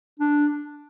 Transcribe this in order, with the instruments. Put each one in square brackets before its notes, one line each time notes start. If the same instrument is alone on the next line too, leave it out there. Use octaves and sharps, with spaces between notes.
[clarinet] D4